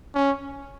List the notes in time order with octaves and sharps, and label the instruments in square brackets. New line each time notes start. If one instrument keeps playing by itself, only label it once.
[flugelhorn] C#4